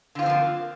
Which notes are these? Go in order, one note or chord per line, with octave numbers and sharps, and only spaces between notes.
D3 F3 A#3 C4 F4